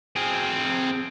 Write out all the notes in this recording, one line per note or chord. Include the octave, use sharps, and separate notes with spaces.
C4 G#4